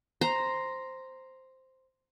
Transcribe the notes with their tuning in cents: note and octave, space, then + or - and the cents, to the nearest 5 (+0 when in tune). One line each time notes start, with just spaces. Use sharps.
C5 +0 A#5 +0